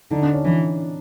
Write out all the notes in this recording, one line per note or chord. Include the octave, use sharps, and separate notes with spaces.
D3 D#4
D4
C#4
E3 D4